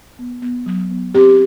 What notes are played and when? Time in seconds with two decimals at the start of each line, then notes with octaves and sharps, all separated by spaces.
0.19 B3
0.42 B3
0.66 F#3
0.90 B3
1.14 C4 G4